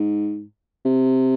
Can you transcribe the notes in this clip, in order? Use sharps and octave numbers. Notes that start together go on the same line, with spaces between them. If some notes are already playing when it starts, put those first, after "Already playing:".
Already playing: G#2
C3